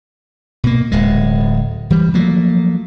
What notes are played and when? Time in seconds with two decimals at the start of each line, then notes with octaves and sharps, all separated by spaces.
0.64 B2 A#3
0.92 D1 G#3
1.90 E3 G3
2.14 F3 F#3 A3 A#3